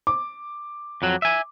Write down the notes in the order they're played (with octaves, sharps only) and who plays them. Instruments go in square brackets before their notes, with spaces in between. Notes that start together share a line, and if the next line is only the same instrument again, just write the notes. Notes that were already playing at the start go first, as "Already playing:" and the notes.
[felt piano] D6
[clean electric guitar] F2 F#3
E5 G#5